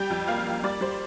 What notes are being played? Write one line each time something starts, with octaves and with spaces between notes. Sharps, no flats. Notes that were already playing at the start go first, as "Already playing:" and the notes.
Already playing: G3 G5
F2
A#3 F5
A#3
G3 D5
G3 C5